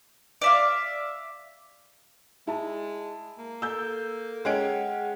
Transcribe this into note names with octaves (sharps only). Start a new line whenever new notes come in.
D5 E5 F5
G#3 E4 A5
A#3
A4 E6 G6
G#3 C#4 G#4 F#5 G5 D7